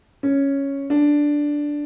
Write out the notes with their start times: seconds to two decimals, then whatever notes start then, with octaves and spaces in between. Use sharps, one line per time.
0.23 C#4
0.90 D4